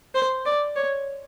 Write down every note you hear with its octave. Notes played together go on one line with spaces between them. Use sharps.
C5
D5
C#5